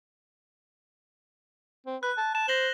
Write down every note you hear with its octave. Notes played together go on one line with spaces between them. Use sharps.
C4
B4 F#6
A5
A5 E7
C5 A#6 F#7 G7